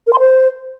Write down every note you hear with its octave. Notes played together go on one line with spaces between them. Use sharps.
A#4
C6
C5